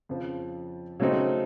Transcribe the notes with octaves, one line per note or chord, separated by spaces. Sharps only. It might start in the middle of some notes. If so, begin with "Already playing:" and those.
F2 C#3 F3
C#3 F#3 A3 C4 D#4